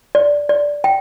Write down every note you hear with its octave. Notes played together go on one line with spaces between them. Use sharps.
D5
D5
G5